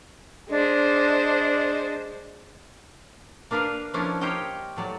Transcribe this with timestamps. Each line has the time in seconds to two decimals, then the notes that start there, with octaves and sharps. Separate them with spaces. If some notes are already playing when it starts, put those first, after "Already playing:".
0.50 G#3 D4 C5
3.51 A#3 D4 A#4 B4 F5
3.94 F3 A#3 C#4 D4 E4
4.21 G4 A#4 C5 C#5 D#5 G5
4.77 A2 F#3 D5